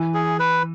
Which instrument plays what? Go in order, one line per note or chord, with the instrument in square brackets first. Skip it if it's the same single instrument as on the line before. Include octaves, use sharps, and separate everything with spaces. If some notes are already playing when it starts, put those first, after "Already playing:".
Already playing: [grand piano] E3
[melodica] G#4
B4